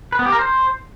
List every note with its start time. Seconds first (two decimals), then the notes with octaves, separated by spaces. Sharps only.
0.12 B4
0.19 B3
0.26 G4
0.32 A#4
0.39 C5